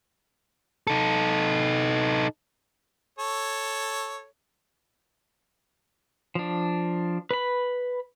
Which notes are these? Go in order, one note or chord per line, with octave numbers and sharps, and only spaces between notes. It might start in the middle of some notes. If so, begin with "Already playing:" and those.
D#4 A4
A4 C#5
F3 D4
B4 B5